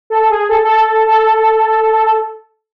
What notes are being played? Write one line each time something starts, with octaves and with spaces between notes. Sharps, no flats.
A4
G#4
A4
A4
A4